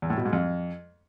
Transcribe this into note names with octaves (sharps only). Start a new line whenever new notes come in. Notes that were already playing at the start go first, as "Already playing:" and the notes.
E2
A2
B2
G#2
F2